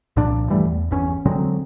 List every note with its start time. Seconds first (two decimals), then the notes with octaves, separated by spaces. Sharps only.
0.16 C2 A#2 F3 D4
0.50 G2 E3 G3 A3
0.65 E2
0.91 G1 E2 C#4
1.26 D3 F#3 G#3 C4